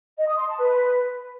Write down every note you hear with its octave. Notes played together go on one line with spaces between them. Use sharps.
D#5
D#6
C6
A5
B4